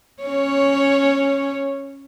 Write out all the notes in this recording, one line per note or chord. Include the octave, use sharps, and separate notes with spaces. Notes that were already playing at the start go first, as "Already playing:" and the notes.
C#4 C#5